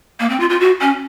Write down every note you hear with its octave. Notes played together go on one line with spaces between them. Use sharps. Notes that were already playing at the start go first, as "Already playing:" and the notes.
A#3
C4
F4
F4
F#4
C#4